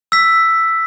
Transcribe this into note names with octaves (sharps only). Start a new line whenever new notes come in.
E6 B6